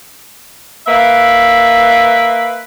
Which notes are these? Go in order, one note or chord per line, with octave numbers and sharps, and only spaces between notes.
A#3 B4 E5